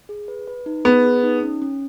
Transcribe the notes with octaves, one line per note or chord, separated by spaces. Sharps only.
G#4
B4
B4
D#4
B3 G#4
G#4
D#4
C#4
C#4